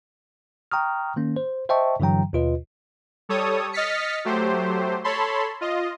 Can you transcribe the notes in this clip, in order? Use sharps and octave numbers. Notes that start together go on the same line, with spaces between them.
G5 A#5 C#6 D#6 F6
D#3 A#3 C#4
C5
C5 D#5 E5 G5 A5 C#6
G2 D3 E3 F#3 G5 A#5
D#2 B2 F4 B4 D#5
G3 A4 C#5 D#6
D#5 F6 A6 B6 C#7
F#3 A3 G4 C5
A4 C#5 A5 B5 C6
F4 D#5